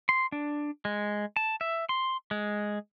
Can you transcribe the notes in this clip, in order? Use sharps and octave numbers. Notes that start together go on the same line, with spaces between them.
C6
D4
G#3
A5
E5
C6
G#3